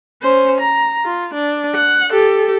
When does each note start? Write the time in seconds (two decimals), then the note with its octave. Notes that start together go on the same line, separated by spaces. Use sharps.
0.22 C#4 C5
0.61 A#5
1.04 F4
1.34 D4
1.75 F#5
2.12 G4 A4